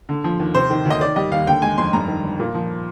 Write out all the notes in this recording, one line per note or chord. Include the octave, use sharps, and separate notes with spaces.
D3
F3
D#2
C3 C5
D#3
D2
D#5
D#3 D5
G3 D#5
D#2 F5
D3 G5
G#3 G#5
F2 C6
G2 A#5
D#3
G1
A#2
F3